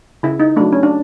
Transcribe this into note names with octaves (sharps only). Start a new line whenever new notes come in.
C#3 E4
D#4
F#3 A3 D4
C#4
D4